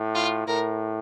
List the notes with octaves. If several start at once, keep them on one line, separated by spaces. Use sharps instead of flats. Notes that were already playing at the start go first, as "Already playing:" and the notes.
Already playing: A2
F4
A2 A#4